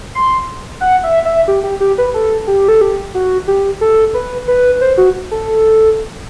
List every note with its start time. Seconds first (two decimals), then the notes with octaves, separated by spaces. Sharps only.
0.15 C6
0.81 F#5
1.03 E5
1.25 E5
1.48 G4
1.64 G4
1.80 G4
1.98 B4
2.14 A4
2.47 G4
2.68 A4
2.81 G4
3.15 F#4
3.47 G4
3.81 A4
4.14 B4
4.48 B4
4.81 C5
4.97 F#4
5.31 A4